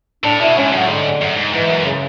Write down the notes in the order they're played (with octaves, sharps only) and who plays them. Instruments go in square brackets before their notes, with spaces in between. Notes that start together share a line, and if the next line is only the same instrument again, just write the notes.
[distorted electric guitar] A2 [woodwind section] D4
[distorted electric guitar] B2 [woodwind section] E4
[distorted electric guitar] G#2 [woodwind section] C#4
[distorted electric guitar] A2 [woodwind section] F#3
[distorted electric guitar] G#2 [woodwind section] D3
[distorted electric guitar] F#2
G#2
[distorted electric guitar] G#2 [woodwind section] E3
[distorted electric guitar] F#2
[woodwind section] C#3